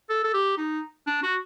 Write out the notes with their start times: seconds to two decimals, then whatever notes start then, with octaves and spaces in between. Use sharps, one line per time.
0.09 A4
0.24 A4
0.34 G4
0.58 D#4
1.07 D4
1.23 F#4